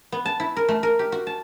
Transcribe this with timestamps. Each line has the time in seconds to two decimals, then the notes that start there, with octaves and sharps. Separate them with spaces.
0.12 B3
0.25 A5
0.40 E4
0.57 A#4
0.69 A3
0.83 A#4
0.99 G4
1.12 F#4
1.27 A5